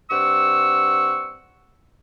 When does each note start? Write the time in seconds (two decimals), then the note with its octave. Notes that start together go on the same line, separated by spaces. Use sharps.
0.11 G2 C4 F#5 C#6 E6